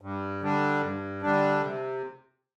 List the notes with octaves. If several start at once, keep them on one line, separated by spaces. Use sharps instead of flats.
G2
D3 G3 D4
G2
D3 G3 D4
C3